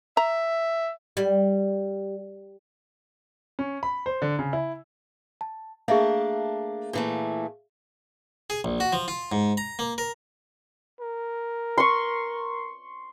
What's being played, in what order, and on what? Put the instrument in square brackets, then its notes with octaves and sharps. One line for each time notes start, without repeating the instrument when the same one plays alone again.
[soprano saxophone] E5 [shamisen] A#5
[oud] G3
[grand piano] C#4
B5
C5
D3
C#3
E4
[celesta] A5
[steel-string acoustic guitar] A3 A#3 D4 [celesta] G#4 E5 F5
[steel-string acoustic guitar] A#2 E3 A3
[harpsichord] G#4
A#1
F#4
F3
F4
G#2
A#5
A#3
A#4
[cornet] A#4
[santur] C6 C#6